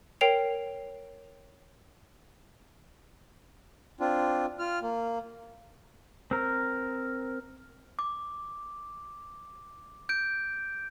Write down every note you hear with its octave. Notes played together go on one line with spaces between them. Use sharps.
A#4 C#5 G5 C7 D7 F7
C4 D4 F4
F4 F6
A#3
C4 A#4
D6
G6 D7